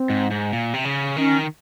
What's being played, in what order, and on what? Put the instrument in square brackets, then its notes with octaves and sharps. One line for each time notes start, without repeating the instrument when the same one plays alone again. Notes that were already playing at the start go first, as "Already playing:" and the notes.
Already playing: [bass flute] C4
[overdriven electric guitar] G#2
G#2
A#2
C3
C#3
[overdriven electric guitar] D#3 [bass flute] C#4